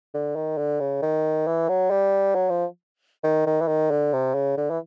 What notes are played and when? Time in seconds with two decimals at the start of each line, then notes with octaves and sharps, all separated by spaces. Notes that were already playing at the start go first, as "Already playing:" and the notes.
0.14 D3
0.36 D#3
0.58 D3
0.80 C#3
1.02 D#3
1.47 E3
1.69 F#3
1.90 G3
2.35 F#3
2.50 F3
3.24 D#3
3.46 D#3
3.61 E3
3.68 D#3
3.91 D3
4.13 C3
4.35 C#3
4.57 D3
4.70 E3